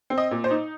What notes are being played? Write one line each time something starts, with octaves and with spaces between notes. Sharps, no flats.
C4
D#5
A#2
C5
D#4